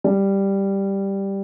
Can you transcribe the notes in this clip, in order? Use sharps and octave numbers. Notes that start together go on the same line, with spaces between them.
G3